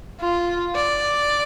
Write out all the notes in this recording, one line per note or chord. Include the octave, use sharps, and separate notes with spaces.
F4
D5